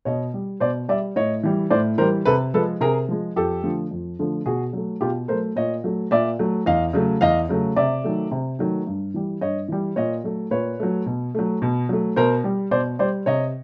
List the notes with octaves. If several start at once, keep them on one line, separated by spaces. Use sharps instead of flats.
B2 C#5 D#5
G3
B2 C5 D5
G3 D5 E5
A2 C#5 D#5
E3 G3
A2 C5 D5
E3 G3 A#4 C5
C3 A4 B4
F3 G#3 A4 B4
C3 G#4 A#4
F3 G#3
F2 G4 A4
D3 F3 A3
F2
D3 F3 A3
B2 F#4 G#4
F#3 A3
B2 F4 G4
F#3 A3 A#4 C5
A#2 C#5 D#5
F#3 A3
A#2 D5 E5
F#3 A3
E2 D#5 F5
C#3 F#3 A3
E2 D#5 F5
C#3 F#3 A3
C3 D5 E5
D#3 F#3 A3
C3
D#3 F#3 A3
G2
E3 G3
G2 C#5 D#5
E3 G3
A#2 C#5 D#5
F#3 A3
A#2 B4 C#5
F#3 A3
B2
F#3 A3
B2
F#3 A3
B2 A#4 C5
G3
B2 C5 D5
G3 C5 D5
C3 C#5 D#5